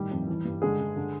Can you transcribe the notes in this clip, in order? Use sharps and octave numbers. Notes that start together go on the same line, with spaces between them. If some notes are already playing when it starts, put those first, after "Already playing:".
Already playing: A2 D#3 G3 G4
F2
E3
G2
D3 G#3 G#4
D3
D3